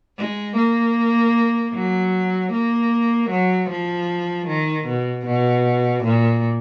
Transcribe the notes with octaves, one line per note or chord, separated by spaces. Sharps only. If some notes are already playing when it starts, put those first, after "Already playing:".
G#3
A#3
F#3
A#3
F#3
F3
D#3
B2
B2
A#2